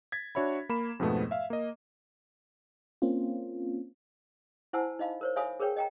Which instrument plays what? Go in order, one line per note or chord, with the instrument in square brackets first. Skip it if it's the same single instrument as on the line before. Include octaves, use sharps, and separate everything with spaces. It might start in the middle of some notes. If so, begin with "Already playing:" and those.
[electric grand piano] G#6 A6 B6
D4 F#4 C#5 E5 B5
A#3 B5 E7
F2 G#2 B2 F3 A3 B3
E5 F5
A#3 D#5
[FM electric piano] A#3 C4 C#4 F4
[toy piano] E4 C5 F#5 G#5 A5 E6
D#4 D#5 F5 B5
A#4 C5 C#5
C#5 E5 F5 G#5 B5 D#6
G#4 A#4 B4 C#5 G5
D#5 G5 A#5